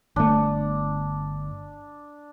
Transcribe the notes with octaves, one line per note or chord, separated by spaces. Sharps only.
G1 A3 D4